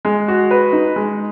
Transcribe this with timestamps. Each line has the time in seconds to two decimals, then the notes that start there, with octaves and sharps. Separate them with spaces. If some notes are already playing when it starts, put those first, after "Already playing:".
0.05 G#3
0.28 F#4
0.51 B4
0.73 D#4
0.96 G#3